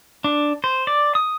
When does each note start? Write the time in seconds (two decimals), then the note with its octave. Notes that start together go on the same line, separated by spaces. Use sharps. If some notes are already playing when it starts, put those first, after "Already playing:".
0.24 D4
0.64 C5
0.87 D5
1.15 D#6